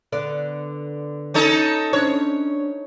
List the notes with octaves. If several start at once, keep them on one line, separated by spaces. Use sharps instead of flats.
D3 B3 D5
C#4 D#4 A4
C#4 D4 C5 C#5